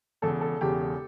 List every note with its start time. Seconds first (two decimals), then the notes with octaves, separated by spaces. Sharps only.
0.22 E1 E2 C#3 A4
0.41 A4
0.61 E1 E2 C#3 G4